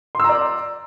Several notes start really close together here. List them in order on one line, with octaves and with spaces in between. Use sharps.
C6 E6 A#5 D5